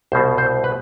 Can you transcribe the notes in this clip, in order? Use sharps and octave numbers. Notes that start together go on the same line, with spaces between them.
C2 B2 C5
C5
B4